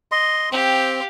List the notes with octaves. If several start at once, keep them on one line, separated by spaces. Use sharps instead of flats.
D#5 C6
C4 G4 F5